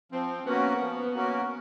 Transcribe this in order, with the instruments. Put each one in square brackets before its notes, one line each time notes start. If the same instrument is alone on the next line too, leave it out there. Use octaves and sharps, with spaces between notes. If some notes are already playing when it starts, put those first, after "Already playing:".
[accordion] F3 [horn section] C4
[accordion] A#3 C#4 F#4 A#4 [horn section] B3
[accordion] F3
A#3 C#4 F#4 A#4